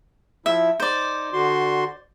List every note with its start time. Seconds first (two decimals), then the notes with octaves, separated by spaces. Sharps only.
0.46 F3 E4 E5
0.80 D#4 C5 D5
1.33 D3 F#4 C6